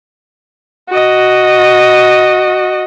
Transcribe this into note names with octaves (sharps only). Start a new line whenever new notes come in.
F#4 D#5